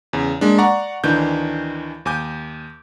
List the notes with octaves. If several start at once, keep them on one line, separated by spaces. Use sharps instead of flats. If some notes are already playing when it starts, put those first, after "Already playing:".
E2 C#3
G#3 A#3 D4
D5 F#5 A#5 C#6
D2 D#3 E3 D4 G6
D#2 G#5 D6 G6